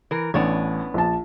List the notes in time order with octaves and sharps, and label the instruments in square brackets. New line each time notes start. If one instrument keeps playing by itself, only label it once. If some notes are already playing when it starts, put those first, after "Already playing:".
[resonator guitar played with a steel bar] E3 A#4
[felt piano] A1 [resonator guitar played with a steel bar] B3 D4 C#5
[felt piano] A#1 A5